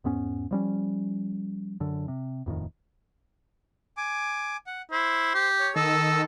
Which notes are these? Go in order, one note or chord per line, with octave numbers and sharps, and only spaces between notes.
E2 G#2 B3 C#4
F3 G3 C#4
F#2 D3
C3
D#1 F2 A2 D#3
G#5 D6
F#5
E4 C5
G4
C#5
D#3 A4 D#5 E6